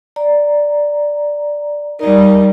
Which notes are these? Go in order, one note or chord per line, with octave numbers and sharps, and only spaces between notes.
D5 A#5
G3 D#4 A#4 D5